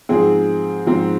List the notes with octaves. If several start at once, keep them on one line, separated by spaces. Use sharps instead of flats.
G#2 F3 C4 G#4
G#2 F3 C4